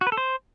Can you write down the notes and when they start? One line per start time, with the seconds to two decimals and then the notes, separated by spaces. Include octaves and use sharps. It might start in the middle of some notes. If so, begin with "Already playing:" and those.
0.01 F#4
0.07 B4
0.12 A4
0.17 C5